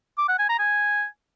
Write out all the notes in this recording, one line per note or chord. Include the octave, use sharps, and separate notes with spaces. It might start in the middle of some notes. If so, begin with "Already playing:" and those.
D6
F#5
G#5
A#5
G#5